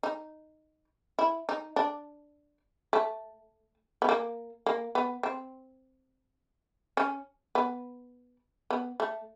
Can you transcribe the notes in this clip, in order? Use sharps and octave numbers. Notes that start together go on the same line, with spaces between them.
D#4
E4
D#4
D4
A3
B3
A#3
A#3
B3
C4
C#4
B3
B3
A3